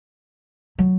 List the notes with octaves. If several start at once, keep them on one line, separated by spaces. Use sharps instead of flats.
F#3